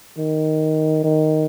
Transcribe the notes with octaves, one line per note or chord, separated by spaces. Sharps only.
D#3
D#3